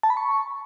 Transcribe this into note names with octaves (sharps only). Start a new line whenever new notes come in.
A5
B5
C#6